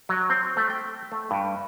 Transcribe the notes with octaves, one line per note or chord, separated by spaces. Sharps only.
F#3
C4
A3
G5
A3
G2